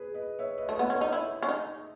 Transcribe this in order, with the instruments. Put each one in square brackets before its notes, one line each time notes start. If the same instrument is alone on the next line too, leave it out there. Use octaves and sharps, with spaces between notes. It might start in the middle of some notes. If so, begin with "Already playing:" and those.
Already playing: [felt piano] G#4 B4
B4 D#5
C#5 E5
B4 D#5
[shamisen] A3
[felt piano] B4 D#5
[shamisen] B3
[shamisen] C#4 [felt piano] A4 C#5
[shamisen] D#4
E4
C#4
D#4